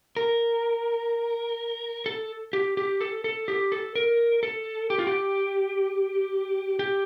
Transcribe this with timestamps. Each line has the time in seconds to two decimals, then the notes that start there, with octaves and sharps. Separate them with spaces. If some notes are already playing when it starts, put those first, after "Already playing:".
0.17 A#4
2.06 A4
2.53 G4
2.77 G4
3.01 A4
3.24 A4
3.48 G4
3.72 A4
3.95 A#4
4.43 A4
4.90 G4
4.99 F4
5.07 G4
6.79 G4